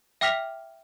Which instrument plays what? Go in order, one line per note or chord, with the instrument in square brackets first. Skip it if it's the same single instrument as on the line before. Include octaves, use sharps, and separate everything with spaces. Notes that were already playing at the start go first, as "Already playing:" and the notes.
[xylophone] E5 G5 D6 F6 B6 F7